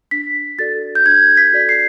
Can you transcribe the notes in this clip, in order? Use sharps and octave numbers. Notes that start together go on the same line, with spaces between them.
D4 B6
F#4 A4 D5 A6
G6
D4 G#6
B6
F#4 A4 D5
C7